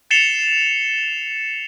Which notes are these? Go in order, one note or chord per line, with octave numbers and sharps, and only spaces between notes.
A6 C7 C#7 E7 F7 G7